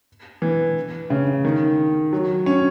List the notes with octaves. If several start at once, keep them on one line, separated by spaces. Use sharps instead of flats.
E3
C#3
D#3
F#3
C#4